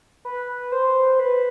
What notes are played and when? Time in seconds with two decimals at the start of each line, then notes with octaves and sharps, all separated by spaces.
0.25 B4
0.72 C5
1.19 B4